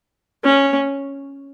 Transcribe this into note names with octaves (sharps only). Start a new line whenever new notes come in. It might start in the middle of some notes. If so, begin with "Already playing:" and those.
C#4